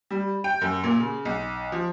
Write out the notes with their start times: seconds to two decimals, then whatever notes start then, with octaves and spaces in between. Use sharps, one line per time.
0.11 G3
0.44 G5
0.61 F#2
0.84 A#2
0.99 C#3
1.25 B1
1.72 F3